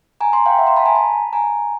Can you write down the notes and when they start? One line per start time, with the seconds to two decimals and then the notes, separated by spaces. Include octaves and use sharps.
0.21 G#5 A#5
0.33 A#5 C6
0.46 F5 G5
0.58 E5 F#5
0.67 A#5 C6
0.76 A5 B5
0.86 G#5 A#5
0.95 A5 B5
1.33 G#5 A#5